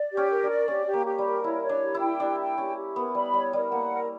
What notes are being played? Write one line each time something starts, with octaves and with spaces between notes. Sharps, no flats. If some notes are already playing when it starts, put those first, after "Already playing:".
Already playing: D5
G4
C#4
A#4
D4
D5
C#4 G4
G4
A#3
G4
G3
A#4
E4 C#5
C#5
D4
G4
E4
G5
D4 G4
G5
C#4 G4
G4
B3 A#4
G3 B5
G3 C#5
G3 A#4
A#3 F#5
A#4